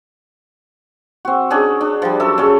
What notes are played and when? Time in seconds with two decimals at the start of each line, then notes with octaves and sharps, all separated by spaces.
1.25 C4 F#4
1.50 C#4 D4 G#4
1.81 D4
2.02 F3 G3
2.20 F#2 A4 E5
2.38 C#3 C#4